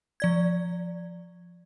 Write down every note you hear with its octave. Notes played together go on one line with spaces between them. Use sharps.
F3 D5 G#6